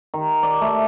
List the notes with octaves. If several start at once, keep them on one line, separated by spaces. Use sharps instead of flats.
D#3
D5
A3